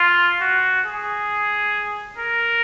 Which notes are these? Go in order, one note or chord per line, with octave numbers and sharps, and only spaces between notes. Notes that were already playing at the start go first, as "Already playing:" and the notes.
Already playing: F4
F#4
G#4
A#4